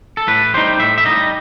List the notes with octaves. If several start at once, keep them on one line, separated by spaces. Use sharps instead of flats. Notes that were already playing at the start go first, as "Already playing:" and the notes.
A4
A2 B4
G3 D#4 C5
A2 E5
E5
G3 D#4 D#5